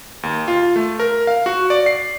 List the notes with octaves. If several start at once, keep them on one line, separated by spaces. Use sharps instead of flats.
D#2
F4
A3
A#4
F5
F#4
D5
C7